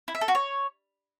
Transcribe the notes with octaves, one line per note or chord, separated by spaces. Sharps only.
E4
E5
A4
F#4
C#5